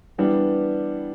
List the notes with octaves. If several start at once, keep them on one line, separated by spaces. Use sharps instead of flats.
E3 G3 B3 D4